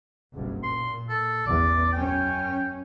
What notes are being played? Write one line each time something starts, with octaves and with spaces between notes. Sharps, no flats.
F#1 B1 G2
A#2 C6
A4
A1 E2 D5
F#2 C#4 G5